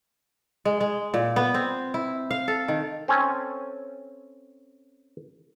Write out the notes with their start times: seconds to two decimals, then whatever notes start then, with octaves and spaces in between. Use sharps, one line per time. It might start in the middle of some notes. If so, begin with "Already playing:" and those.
0.65 G#3
0.81 G#3
1.14 A#2
1.36 B3
1.54 C4
1.94 E4
2.31 F5
2.48 A4
2.68 D#3
3.08 C4 C#4 A4 G#5